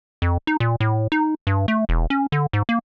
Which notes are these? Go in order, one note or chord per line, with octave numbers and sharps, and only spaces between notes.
F2
D#4
A#2
A2
D#4
G2
A3
E1
C#4
D3
G#2
A#3